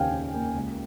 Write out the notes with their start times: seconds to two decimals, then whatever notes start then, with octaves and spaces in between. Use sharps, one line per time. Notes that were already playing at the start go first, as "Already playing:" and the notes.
Already playing: D#2 A#3 C#4 F5 G5 G#5
0.11 C#4
0.34 A#3
0.56 C#2